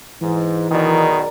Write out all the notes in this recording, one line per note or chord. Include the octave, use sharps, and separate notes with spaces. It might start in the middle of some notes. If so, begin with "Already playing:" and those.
G#2 E3
B1 B2 D#3 G#4 A#4 D5